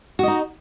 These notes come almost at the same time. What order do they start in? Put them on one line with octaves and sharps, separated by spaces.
F#4 D#5 D#4